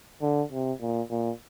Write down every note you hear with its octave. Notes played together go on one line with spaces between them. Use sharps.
D3
C3
A#2
A#2